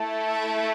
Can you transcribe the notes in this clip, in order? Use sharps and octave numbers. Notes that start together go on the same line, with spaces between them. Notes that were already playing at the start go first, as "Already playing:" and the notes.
Already playing: A3 E4 A4
E5